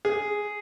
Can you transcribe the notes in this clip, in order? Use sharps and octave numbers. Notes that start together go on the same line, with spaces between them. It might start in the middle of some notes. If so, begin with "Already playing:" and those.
G#4